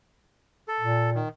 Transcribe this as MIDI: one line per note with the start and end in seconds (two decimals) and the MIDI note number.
0.68 1.10 69
0.80 1.25 46
1.15 1.29 51